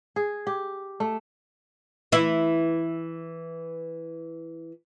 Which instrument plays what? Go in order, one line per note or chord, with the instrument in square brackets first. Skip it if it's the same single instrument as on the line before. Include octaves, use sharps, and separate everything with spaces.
[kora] G#4
G4
A3
[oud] E3 E4